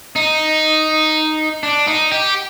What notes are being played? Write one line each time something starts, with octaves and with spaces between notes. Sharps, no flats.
D#4
D4
D#4
G4